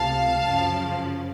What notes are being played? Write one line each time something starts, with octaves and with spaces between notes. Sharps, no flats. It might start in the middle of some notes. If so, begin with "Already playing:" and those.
Already playing: C#2 C3 F3 A3 F5 A5
F#2 C#3 F3